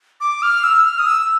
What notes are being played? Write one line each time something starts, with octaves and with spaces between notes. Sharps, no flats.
D6
F6
E6
F6
D#6
E6